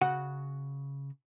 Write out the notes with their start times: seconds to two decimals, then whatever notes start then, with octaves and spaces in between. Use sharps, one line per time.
0.01 C#3 F#4 F#5